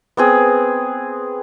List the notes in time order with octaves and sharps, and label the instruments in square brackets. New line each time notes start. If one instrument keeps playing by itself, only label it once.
[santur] B3 C4 G#4